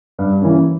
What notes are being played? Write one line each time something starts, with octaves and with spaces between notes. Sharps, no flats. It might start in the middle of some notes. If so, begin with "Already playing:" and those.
G2
E3 A#3 C#4